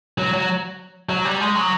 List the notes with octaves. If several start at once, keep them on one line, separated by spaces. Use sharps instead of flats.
F#3
F#3
F#3
G3
G#3
F#3